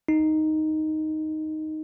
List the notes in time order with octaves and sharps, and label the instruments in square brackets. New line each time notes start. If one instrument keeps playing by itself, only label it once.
[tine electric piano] D#4